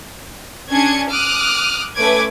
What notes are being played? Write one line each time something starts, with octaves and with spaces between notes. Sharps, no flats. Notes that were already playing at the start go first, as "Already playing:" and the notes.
C#4 D4 G#4 G#6 C#7
D6 D#6 F6 F#6
A3 C#4 B4 D6 G#6